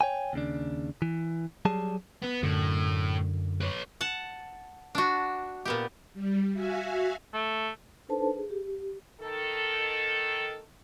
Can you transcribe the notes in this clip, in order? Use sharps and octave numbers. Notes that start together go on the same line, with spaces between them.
C#5 G5 G#5
D#2 C#3 D4
E3
F#3 G3 G#4 A5
B3
F#2 A2 D3
B4 C#5
F#5 A5
D4 F#4
A#2 B3 G4
G3
F#4 E5 F5 G#5
A3
D4 D#4 A4 B4 C5 A5
G#4
G4
D#3 A4